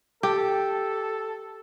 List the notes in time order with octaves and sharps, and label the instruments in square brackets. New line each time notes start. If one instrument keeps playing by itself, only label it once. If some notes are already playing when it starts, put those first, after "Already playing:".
[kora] G4 [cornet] A4